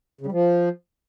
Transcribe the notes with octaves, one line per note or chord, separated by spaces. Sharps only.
C#3
G3
F3